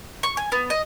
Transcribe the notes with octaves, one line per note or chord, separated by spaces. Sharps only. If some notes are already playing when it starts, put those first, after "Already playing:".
C#6
G#5
B3
D#5